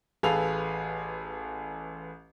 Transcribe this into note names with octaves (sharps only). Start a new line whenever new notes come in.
A1 G#4 A4 B4 F5 F7